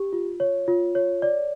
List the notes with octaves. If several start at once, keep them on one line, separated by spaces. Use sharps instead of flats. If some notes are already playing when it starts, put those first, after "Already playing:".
Already playing: G4
F4
C#5
F4
C#5
D5